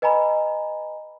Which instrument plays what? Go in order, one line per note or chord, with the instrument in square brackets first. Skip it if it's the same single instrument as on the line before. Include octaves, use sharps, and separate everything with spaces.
[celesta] B4 D#5 G#5 A#5 B5